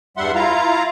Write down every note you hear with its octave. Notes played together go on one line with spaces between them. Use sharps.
E2 G2 G3 E5 F#5 C6
E4 F4 F5 A#5